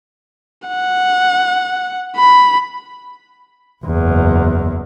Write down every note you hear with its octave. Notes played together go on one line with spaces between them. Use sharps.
F#5
B5
F#1 E2